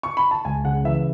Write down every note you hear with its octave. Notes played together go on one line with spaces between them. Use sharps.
C#6
B5
A5
C#2 G#5
C#3 F#5
E3 E5